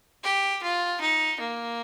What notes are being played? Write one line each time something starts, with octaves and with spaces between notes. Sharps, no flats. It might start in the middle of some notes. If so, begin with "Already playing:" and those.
G4
F4
D#4
A#3